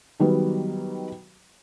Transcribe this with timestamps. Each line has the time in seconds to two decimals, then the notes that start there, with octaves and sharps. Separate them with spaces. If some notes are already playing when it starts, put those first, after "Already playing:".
0.20 D#3 F#3 G3 B3